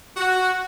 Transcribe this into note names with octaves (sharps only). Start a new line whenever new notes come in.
F#4